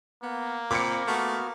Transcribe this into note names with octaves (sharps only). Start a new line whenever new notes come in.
A#3 B3
A#2 C4 B5 D6 C#7
A3 B3 F#4 F6